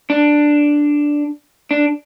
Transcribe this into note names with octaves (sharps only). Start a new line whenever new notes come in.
D4
D4